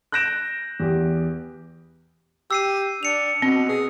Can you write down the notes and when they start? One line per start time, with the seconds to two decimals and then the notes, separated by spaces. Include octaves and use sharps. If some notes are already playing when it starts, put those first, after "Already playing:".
0.12 F#6 G6 A#6 D7 E7
0.80 E2 G4
2.51 G4 E6 C7 D#7
3.03 D4 C#7 F7
3.42 B2 C4
3.69 G#4